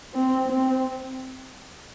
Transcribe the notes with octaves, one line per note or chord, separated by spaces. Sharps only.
C4
C4